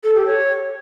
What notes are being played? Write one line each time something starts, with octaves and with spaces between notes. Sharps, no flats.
A4
G4
C#5